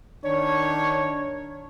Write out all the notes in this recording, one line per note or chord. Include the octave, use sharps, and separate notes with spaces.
D#3 D4 C#5